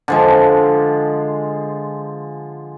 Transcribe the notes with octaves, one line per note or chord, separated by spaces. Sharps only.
D3 F3 G#3